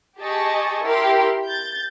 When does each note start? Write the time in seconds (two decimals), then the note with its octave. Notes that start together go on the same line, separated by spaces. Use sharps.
0.19 G4 G#4 D#5 A5 C#6
0.84 E4 G4 A#4 C6
1.46 G6 A6